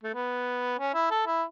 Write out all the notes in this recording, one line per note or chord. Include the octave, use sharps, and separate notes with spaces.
A3
B3
C#4
E4
A4
E4